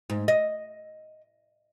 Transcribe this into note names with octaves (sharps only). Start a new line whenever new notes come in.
G#2
D#5